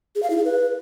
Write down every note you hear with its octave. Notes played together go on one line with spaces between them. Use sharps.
G#4
F5
E4
G#4
B4